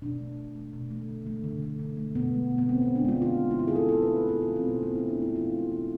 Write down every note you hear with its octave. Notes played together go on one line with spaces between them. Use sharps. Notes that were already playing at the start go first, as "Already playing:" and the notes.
B2 D4
A3
B2
A3
B2
A3
D3
A3
D3
A3
D3
A3
B2 B3
G#3
B2
B3
G#3 C4
B2 C4
D4
G#3 F4
D3 F4
A3
E4
D3 F4
G#4
A3 A4
D3 A4
B4
A3
A4
B2 G#4
A3 F4
C4
B2 B3
A3 C4
B2 E4
D4
A3 E4
B2 F4
G#3
B2